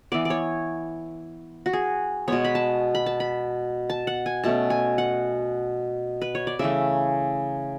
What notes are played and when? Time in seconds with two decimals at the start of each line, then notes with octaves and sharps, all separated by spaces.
0.12 E3 B3 D5
0.25 D5
0.30 C#5
1.66 F#4
1.73 G#4
2.28 B2 G#3 B3 C#5
2.45 B5
2.55 A5
2.95 B5
3.06 A5
3.20 B5
3.90 A5
4.07 F#5
4.26 G#5
4.44 B2 A3 C#4 A5
4.70 G#5
4.98 F#5
6.22 B4
6.35 C#5
6.47 D5
6.59 C#3 E3 A3 E5